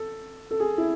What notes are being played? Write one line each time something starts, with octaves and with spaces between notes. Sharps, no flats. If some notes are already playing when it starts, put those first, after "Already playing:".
Already playing: A4
A4
G#4
E4